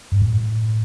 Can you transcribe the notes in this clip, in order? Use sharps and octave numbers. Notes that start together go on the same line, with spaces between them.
G2
A2